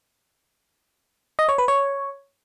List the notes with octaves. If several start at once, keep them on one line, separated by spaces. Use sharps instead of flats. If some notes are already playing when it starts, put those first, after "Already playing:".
D#5
C#5
B4
C#5